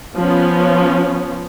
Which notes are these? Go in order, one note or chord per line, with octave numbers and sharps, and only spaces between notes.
F3 B3 C#4